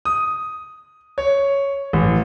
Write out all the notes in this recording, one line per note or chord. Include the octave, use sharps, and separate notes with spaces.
D#6
C#5
A1